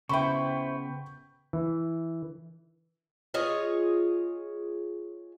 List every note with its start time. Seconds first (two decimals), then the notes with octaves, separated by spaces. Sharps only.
0.09 C#3 B3 E4 C5 G5 B5 C#6
1.53 E3
3.34 F4 G#4 C#5 D#5